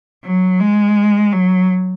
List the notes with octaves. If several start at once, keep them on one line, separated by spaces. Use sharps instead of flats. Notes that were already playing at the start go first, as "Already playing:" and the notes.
F#3
G#3
F#3